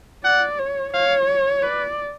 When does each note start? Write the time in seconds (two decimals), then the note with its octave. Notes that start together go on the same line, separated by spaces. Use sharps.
0.24 D5 F#5
0.59 C#5
0.93 C#5 F5
1.62 B4 D5